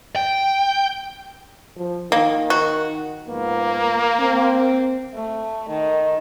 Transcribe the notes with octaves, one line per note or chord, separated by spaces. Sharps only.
G5
F3
D#3 A#3
F#4
G#2 F3 A#3 B3
C4
A3
D#3